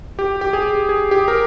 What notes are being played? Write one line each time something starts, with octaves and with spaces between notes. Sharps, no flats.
G4
G4
G#4
G#4
G4
A#4